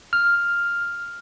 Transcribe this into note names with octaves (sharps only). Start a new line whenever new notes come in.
F6